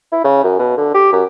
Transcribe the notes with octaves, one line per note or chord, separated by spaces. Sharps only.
E4
C#3
F#2
B2
D3
G4
F#2